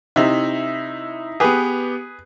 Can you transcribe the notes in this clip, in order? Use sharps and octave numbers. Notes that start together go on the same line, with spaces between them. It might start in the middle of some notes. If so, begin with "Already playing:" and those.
C3 D#4 E4
B3 G4 G#4 B4